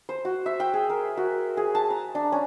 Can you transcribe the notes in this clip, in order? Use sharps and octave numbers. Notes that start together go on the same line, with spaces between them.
C5
F#4
E5
G5
G#4
A#4
F#4
G#4
A5
A#5
D4
C#4